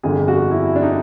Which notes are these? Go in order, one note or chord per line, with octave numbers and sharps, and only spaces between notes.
G1 F2 D3 G#4
F#4
E4
D4
D#4